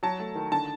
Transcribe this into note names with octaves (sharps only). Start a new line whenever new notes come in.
F#3 A5
A3
D#3
D3 A5